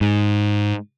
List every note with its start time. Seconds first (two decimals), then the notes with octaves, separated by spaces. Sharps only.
0.01 G#2